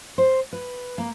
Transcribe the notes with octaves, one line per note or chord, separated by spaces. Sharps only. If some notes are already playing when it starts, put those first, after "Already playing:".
C5
B4
A#3